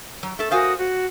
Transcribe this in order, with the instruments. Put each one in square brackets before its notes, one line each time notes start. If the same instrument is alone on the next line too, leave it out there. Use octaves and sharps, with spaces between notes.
[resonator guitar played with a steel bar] F#3
A3 A4
[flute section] F#4 A#4 D#6 [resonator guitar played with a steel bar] C5 F5 G#5
[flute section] F#4